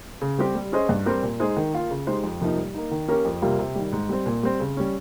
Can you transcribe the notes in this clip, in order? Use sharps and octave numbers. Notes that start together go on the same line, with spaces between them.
C#3
G3 C4 G4
G3
C#4 G#4 C5 D#5
G2
G3 C4 G4 A#4
A#2
G#3 D#4 G#4 C5
D#3
A#3 F4
C#3
G#3 D#4 G4 C5
F2
C3 F3 A#3 D#4
G3
A#3 D#4
D#3
A#3 C#4 G4 A#4
F2
C3 G3 A#3 F4
C3
D#3 G3
G#2
G3 C4
A#2
G3 C4
C#3
G3 C#4